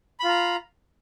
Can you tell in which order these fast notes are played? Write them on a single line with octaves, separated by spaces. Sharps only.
B5 F4 A#5